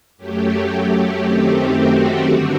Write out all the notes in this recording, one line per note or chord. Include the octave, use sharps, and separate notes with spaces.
F#2 F#3 A3 G4
F#2 D#3 A3 C4
F#4
G2 D3 G3 D4 F#4